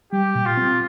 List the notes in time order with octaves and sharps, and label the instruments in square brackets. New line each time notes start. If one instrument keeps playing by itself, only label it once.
[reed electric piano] G3 [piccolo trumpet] G4
[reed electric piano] A#2
[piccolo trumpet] F4
[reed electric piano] C4